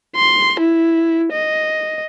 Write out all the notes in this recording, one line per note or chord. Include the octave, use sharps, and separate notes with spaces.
C6
E4
D#5